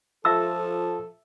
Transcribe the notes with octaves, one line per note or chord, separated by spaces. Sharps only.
F3 F4 A4 E5 A5 D6 E6
A4